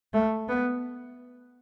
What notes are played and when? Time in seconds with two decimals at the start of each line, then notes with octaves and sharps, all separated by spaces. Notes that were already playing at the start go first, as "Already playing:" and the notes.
0.13 A3
0.48 B3